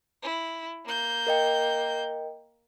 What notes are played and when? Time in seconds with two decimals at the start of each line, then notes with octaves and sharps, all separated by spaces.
0.23 E4
0.85 A#3 G6
1.27 A#4 D#5 G5